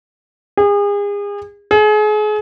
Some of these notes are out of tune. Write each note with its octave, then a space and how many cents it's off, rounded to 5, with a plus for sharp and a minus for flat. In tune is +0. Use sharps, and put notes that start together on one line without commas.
G#4 -35
G#4 +35